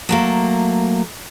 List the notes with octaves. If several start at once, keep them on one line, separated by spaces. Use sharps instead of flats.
F#3 A3 A#3